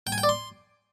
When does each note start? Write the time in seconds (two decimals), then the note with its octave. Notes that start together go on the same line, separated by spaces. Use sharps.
0.07 G5
0.12 G#5
0.18 G5
0.23 D5
0.29 C6